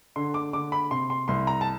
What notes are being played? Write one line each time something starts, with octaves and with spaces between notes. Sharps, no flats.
D3 C6
D6
D3 D6
B5
C3 C6
C6
C2 C6
A#5
A5